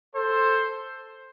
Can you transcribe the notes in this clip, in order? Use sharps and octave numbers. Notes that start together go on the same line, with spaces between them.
A4 C5